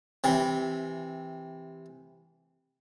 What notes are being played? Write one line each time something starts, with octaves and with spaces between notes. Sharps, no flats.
C3 E3